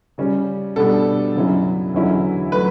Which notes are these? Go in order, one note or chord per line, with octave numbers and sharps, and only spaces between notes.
C#3 G3 C#4
B2 G3 B3 D4 A4
F#2 C#3 F#3 C#4 E4
E2 D3 F#3 C#4 E4
F#3 A3 B4